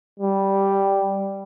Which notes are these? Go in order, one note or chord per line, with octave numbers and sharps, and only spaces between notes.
G3